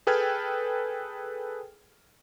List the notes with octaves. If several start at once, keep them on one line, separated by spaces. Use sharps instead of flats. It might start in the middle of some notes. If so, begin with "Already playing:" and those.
G#4 A4 B4 G5 F6 G#6